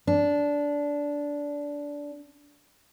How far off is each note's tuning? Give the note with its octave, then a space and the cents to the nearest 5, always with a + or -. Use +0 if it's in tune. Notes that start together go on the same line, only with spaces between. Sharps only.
D4 -15